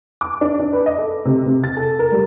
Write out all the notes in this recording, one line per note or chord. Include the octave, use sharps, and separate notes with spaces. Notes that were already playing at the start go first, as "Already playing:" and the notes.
D6
D4
D4
B4
D#5
A4
C3
C3
A6
A4
A#4
G3